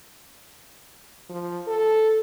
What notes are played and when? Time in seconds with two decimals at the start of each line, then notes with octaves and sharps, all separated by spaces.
1.29 F3
1.68 A4